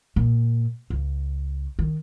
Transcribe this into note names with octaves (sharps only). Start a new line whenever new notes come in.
A#2
C#2
D#3